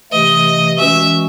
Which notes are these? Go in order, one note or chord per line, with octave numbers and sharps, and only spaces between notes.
C3 E3 A3 D#5
E3 G#3 C#4 F#4 E5